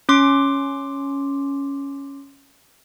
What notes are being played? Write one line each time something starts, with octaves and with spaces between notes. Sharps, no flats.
C#4 C6 D6